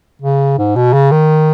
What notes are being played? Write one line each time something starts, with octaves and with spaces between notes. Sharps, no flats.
C#3
G#2
B2
C#3
D#3